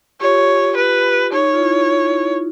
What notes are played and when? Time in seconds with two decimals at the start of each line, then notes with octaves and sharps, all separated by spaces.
0.21 F4 G4 C#5
0.77 B4
1.32 D#4 C#5
1.53 F4
1.61 E4